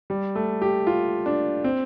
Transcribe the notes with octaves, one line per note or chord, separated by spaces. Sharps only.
G3
A3
G4
F4
D4
C4